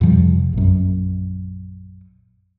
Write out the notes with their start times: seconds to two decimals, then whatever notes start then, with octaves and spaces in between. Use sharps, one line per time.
0.01 F2 C3 F3 G3
0.53 A#1 F#2